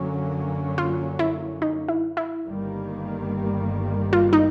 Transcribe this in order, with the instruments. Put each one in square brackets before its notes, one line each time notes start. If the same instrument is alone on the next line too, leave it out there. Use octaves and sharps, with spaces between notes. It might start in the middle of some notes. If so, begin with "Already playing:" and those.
Already playing: [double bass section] F#2 D3 F#3 A#3 C#4
[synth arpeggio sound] F4
E4
D#4
E4
E4
[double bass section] G1 G2 D#3 G3 A#3
[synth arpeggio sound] F4
D#4